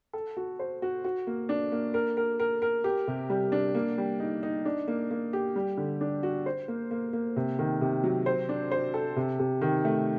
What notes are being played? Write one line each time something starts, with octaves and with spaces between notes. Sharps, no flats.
A4
F#4
C5
F#4
F#4
A#3
D4
A#3
A#4
A#4
A#4
A#4
G4
C3
G3
D4
A#3
G3
D#4
D#4
D4
A#3
A#3
G4
G3
D3
D4
F#4
C5
A#3
A#3
A#3
C3
D#3
C3
F#3
C5
D4
C5
A4
C3
C3
D#3
A3